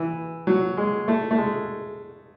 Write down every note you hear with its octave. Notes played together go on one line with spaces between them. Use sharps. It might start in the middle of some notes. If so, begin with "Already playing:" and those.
Already playing: E3
F#3
G#3
A3
A3
G#3